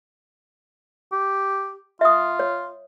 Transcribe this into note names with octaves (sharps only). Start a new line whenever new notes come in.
G4
F4 E5 D#6
C#5